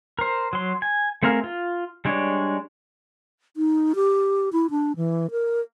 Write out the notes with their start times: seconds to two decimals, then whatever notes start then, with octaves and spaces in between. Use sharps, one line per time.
0.19 A#4 C5
0.53 F#3 C6
0.82 G#5
1.23 A3 C4 G#4 A#4 F5
1.44 F4
2.05 G3 G#3 D4 C#5
3.57 D#4
3.95 G4
4.53 E4
4.70 D4
4.97 E3
5.31 A#4